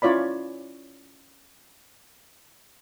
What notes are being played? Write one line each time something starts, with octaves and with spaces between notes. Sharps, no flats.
C#4 E4 F4 C#5 D5 B5